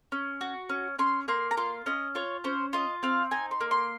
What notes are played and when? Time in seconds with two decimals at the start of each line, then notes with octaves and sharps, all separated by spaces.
0.12 C#4
0.41 F#4
0.69 C#4
0.99 C#4 C6
1.28 A#3 C6
1.51 A#5
1.57 F4 C6
1.86 C#4 D#5
2.15 F4 C#5
2.44 C#4 C5
2.73 F4 D#5
3.03 C4 F5
3.31 D#4 G#5
3.51 C6
3.61 A#3
3.71 C6